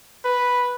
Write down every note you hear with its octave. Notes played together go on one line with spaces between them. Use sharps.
B4